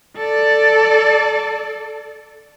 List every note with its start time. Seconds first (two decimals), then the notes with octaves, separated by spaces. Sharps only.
0.17 A4 D5